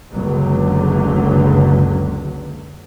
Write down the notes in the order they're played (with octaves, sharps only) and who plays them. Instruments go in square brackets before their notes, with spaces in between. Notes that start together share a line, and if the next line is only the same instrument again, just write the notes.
[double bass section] F#1 C#2 D3 F#3